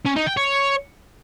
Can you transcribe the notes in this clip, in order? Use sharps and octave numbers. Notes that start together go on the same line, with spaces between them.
C#4
D#4
G5
C#5